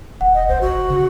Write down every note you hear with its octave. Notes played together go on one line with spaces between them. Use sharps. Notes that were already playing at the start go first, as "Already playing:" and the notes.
D#1 F#5
D#5
C2 C5
G#1 F#4
G1
C#3